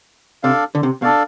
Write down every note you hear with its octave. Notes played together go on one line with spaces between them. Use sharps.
C3 D4 A4 D5 F5
D3
C3
B2 D4 A4 D5 F5